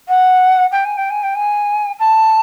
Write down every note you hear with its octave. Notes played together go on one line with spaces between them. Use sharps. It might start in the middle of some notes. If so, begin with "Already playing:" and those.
F#5
G5
G#5
G5
G#5
G5
G#5
A5